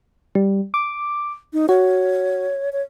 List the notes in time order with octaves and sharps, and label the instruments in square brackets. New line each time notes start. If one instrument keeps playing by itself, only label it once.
[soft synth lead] G3
D6
[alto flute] D#4
[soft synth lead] F#4 [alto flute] C#5
[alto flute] C#5